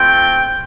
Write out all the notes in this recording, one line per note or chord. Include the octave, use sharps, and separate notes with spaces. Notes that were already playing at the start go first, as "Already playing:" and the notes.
Already playing: A3 C4 F4 G5